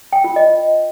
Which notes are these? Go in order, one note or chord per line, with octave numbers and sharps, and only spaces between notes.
G5
F4
D#5